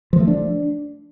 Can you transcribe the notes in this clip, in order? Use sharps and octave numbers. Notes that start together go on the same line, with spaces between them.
F3
A3
D4